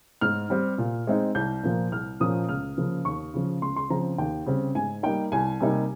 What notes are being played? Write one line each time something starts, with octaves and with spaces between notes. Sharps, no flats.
G#2 F6
G3 C4
A#2
G#3 C4 D#4
C2 G6
A#2 F3 A#3
C2 F6
A#2 F3 A#3 C#4 D#6
C#2 F6
C#3 F3 A#3
D#2 C#6
C#3 F3
C#2 C6
C6
C#3 F3 C4 A#5
D#2 G5
C#3 G3 C4
G#2 G#5
G3 A#3 D#4 G5
C2 G#5
C3 G3 A#3 D#4